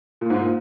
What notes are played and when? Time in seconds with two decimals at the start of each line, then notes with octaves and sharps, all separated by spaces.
0.21 A#2
0.30 G#2
0.41 A#2